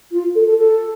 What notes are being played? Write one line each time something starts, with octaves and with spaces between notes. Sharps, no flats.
F4
A4
A4
A4